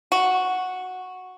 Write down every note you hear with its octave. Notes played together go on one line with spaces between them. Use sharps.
F#4